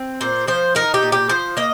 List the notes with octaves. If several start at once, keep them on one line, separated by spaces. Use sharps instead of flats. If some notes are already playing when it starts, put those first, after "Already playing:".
Already playing: C4
A#2 C5
F3 C5
D#4 A#4
G4
A#2
G4
F3 C5
A#3 D#5